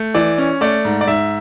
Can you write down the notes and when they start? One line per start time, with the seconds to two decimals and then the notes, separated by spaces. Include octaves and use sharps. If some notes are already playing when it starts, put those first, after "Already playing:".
Already playing: A3
0.15 E3 D5
0.38 C#4
0.61 A3 D5
0.85 G#2
1.01 D5
1.08 G#2 E5